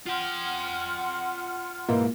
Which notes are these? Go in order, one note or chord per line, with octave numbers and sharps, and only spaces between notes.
F4 F#5 G5 C6 F6
G#2 B2 E3 A#3